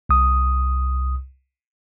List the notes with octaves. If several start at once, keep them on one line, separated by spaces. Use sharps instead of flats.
C2 D#6